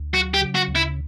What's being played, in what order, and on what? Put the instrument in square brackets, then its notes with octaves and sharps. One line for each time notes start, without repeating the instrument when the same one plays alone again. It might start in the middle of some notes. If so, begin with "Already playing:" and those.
Already playing: [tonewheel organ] D2
[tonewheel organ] F#3 [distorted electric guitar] F#4
[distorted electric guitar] G4
[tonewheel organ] C#3
[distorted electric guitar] F#4
[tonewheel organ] D2
[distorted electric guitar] E4